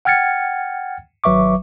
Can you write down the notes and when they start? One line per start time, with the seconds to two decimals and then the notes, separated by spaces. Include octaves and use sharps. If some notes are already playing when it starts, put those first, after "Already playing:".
0.05 F#5 G5 F6 G#6 A6 C#7
1.24 G#1 F#3 B4 E5 C#6 D6